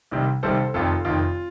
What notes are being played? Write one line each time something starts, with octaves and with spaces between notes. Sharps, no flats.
C2 C3 D#3 G3
C2 C3 D#3 G3 A4 C5
F1 F2 D#3 F4 A4
F1 F2 D#3 F4